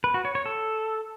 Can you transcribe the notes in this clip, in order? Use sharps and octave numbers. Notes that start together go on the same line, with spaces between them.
B4
F#4
C#5
C#5
A4